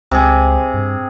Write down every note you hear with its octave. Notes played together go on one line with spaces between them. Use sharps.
C#2 C3 G#4
G2